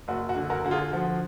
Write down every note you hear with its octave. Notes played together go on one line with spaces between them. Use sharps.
F#1 F#4
F#4
D3
F#4 A#4
D3 F#4
F4 G#4
F3 F#4